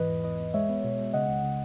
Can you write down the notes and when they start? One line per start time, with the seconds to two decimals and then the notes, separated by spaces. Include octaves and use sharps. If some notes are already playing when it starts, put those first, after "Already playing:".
Already playing: G#2 E3 B4 D#5
0.09 E2
0.24 E2 B4 D#5
0.39 E2
0.54 G#3 C#5 E5
0.69 B3
0.84 B2
0.99 G#3
1.13 C#3 D#5 F#5
1.28 C#2
1.43 C#3